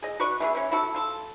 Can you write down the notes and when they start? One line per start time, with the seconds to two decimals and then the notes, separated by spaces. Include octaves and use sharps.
0.02 G#4 D#5
0.20 F#4 B4 D5 C#6
0.40 E3 B3 G#4
0.55 E3 C#4
0.72 E4 F#4 A4
0.95 F4 A4